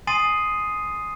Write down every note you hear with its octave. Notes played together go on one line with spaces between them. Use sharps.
G#5 C6 D#6 A6 C7 D#7